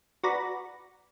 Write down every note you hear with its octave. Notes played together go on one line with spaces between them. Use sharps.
F#4 B4 D5 A#5 B5